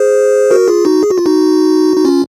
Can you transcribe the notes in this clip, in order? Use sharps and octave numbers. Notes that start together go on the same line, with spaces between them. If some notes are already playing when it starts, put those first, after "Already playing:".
Already playing: G#4 C5
F#4 A#4
F4 G#4
D#4 F#4
G#4
F#4
F4
D#4 F#4
D#4
C#4 F4